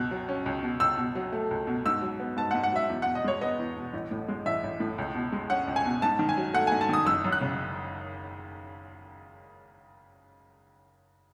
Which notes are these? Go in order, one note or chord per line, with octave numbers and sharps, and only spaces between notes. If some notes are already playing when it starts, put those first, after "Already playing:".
Already playing: C#2 B2 F#6
F#3
C#4
C#2
B2
C#2 E6
B2
F#3
A3
C#2
B2
G#2 E6
F#3
B3
G#2 A5
F#5
G#2
F#5
F#3 E5
E2
F#5
B2
D#5
G#3 C#5
B3 D#5
E2
B2
A1
A2
G#3
A1 E5
A1
A2
C#2
B2
G#3
C#4 F#5
C#2
G#5
B2
G#2 A5
D#3
G#5
F#3
A3 F#5
G#5
G#2
A5
D#3 D#6
F#1 E6
F#2
F#6
C#3